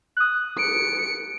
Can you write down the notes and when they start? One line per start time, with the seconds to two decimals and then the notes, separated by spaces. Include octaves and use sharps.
0.17 D#6 F#6
0.59 C#7 D7